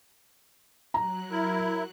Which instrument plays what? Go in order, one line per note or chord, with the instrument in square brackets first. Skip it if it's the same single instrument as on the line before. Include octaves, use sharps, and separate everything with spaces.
[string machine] F#3 F#6 [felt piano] A#5
[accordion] E4 [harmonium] A#4